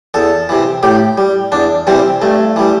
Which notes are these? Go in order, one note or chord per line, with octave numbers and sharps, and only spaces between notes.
E2 A4
C3 E3
A2 G4
G3
E2 D4
C3 E3 G3 C4
G2 A3
E3 G3